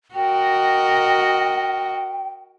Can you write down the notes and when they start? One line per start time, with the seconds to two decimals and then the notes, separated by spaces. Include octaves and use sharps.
0.15 F#4 A#4 D#5 G5